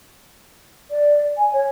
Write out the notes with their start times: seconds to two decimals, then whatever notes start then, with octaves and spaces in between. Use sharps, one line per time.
0.90 D5
1.37 G#5
1.53 C#5